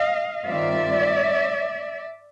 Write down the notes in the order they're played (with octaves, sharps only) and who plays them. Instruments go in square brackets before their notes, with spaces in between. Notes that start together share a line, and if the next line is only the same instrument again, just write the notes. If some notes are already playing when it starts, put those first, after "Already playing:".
Already playing: [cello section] D#5 F5
G2 D#3 G3 C4 F4 D5 E5